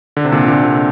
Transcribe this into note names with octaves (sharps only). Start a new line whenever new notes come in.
D3
C3
A#2 D3
A#2 D3
C3